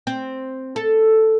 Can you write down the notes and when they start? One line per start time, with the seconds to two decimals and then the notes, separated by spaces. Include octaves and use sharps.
0.07 C4
0.76 A4